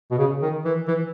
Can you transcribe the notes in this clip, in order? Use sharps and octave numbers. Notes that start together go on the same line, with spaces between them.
B2
C#3
D#3
E3
E3